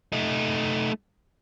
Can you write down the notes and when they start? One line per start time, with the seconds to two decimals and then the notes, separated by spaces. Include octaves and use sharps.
0.12 A3 D#4